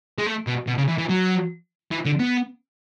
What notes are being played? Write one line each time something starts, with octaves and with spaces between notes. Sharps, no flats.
G#3
A3
B2
B2
C#3
E3
E3
F#3
E3
D3
B3